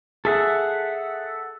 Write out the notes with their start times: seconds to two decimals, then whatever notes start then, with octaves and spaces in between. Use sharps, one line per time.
0.25 G#4 A4 E5 F#5